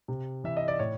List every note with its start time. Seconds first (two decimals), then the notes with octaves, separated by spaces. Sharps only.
0.08 C3
0.44 E3 E5
0.57 D#5
0.68 D5
0.79 A2 C#5